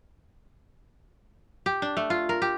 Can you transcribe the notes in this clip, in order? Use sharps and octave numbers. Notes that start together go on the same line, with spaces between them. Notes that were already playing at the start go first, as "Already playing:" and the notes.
G4
D4
A3
F4
A#4
G4